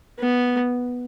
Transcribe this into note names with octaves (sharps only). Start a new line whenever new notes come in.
B3